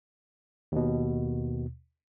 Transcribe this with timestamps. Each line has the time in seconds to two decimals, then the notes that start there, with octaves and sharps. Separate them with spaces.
0.72 D#2 B2